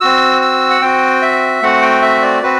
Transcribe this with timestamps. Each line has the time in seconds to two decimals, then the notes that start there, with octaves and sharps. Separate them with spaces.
0.01 C4 F#4 E6
0.42 E6
0.70 F#5
0.82 C4 F#4 G5
1.22 E5
1.62 A3 C4 F#4 F#5
1.82 G5
2.02 E5
2.22 D5
2.43 C4 F#4 B4